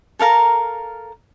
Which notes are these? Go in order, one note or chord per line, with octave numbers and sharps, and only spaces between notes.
A4 A#4 F5 A#5